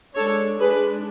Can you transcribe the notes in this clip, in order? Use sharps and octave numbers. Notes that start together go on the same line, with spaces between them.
G#3 D4 A4 C#5
G#3 D4 G#4 B4